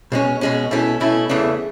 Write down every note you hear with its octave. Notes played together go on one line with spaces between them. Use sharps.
B2 G#3 C#4
B2 G#3 C#4
B2 A3 C#4 E4
B2 A3 C#4 E4
E2 C#3 E3 A3